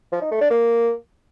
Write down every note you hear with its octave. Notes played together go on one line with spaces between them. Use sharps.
F3
D#4
A3
D4
A#3